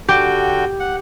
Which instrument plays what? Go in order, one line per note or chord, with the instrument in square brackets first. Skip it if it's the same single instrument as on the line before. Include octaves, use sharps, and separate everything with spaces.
[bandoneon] D3 F#4 G5 [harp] G4
[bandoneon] F#5